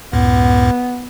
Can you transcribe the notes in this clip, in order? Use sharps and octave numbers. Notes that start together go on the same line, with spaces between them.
C#2 F#2 A2 B3